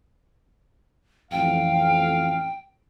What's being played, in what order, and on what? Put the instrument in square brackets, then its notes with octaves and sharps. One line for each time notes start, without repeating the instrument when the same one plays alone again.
[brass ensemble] A1 F2 F5 [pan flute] G5